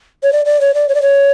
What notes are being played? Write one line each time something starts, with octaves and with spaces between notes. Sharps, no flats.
C#5
D5
D5
C#5
D5
C#5
D5
C#5